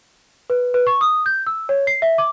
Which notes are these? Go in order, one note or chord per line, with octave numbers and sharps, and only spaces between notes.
B4
B4
C#6
D#6
G6
E6
C#5
C7
E5
D6